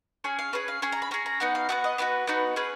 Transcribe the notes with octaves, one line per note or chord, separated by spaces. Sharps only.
C#4 G#4 G#5
F5
C#4 G#4 B4
F5
C#4 G#4 G#5
A#5
B5
C#4 G#4 A#5
A#5
B3 D#4 F#4 F#5
F5
B3 D#4 F#4 F#5
D#5
B3 D#4 F#4 B4
B3 D#4 F#4
C#4 G#4 B4